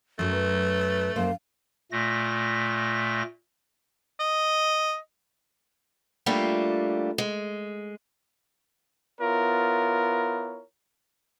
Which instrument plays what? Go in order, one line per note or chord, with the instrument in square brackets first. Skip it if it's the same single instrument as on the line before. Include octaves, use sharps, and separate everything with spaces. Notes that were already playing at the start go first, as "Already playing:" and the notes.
[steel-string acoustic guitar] F#2 F#3 [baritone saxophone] A3
[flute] B4
[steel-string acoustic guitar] F#2 A#3 C5 [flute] F5
[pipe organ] A#2 A3 A#6
[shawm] D#5
[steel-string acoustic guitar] G3 A3 A#3 D4 F4
G#3
[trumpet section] B3 E4 F4 A#4 C#5